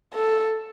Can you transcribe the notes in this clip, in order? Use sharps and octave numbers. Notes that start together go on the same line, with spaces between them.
A4